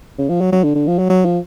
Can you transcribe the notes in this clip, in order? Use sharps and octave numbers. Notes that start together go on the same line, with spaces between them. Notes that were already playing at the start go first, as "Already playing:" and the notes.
C#3
F3
F#3
F#3
D3
D3
F3
F#3
F#3
F3